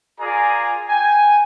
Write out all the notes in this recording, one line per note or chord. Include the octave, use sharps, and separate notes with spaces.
F4 G#4 A#4 D5 G#5 A#5
G5 G#5